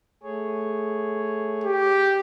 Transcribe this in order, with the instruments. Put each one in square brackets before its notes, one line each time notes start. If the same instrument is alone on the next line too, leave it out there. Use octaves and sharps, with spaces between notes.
[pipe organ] A3 G#4 C#5
[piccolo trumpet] G4